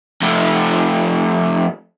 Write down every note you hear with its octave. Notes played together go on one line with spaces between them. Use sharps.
F2 A3